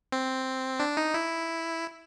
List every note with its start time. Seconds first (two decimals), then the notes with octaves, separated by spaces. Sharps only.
0.12 C4
0.80 D4
0.97 D#4
1.14 E4